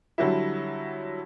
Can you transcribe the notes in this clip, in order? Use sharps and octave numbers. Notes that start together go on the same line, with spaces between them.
D3 F#3 G3 E4